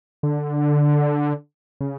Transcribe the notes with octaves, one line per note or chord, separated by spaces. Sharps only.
D3
C#3